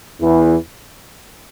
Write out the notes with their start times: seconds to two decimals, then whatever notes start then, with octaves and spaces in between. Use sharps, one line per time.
0.20 E2 E3